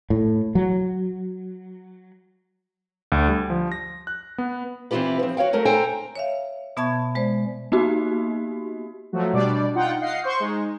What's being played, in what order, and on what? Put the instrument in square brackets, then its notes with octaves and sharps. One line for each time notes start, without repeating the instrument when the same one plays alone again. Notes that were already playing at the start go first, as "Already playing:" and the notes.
[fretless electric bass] A2
F#3
[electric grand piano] D2
G3
F3
A#6
F#6
B3
[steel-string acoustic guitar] E3 C4 E4 F4 G4 B4
F3 C4
F#4 C#5 F5 G5
F#3 A3 A#4
A4 C5 G5 G#5 A#5
[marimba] C#5 E5 F5
B2 B3 E5 A5 C#6 G#6
G#3 C5 D5
[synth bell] A#3 B3 D#4 F#4 G4
[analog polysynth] F3 F#3 A3 F#4
B2 G3 D4 D5
D#4 F4 F#5 G5
D#5 F5 F#5 C7
C5 C6 C#6 G6
G#3 D#4